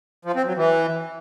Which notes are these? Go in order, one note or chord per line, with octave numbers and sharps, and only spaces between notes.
F3
C4
F#3
E3